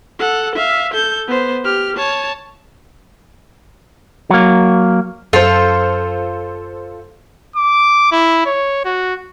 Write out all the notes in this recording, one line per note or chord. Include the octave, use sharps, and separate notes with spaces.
A4 F#5
E5 F5
A4 G6
B3 C5
G4 F6
C#5 A5
F#3 A#3
F#2 F4 A4 C5
D6
E4
C#5
F#4